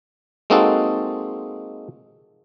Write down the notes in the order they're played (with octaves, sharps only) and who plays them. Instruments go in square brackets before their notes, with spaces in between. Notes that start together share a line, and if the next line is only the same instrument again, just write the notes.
[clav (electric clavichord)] G#3 A#3 C4 D#4 F#4 A4